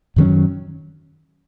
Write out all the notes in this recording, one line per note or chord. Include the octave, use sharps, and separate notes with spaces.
F#2 D#3 F#3 C#4